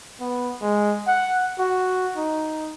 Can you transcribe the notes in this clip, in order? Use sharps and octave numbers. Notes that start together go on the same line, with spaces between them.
B3
G#3
F#5
F#4
D#4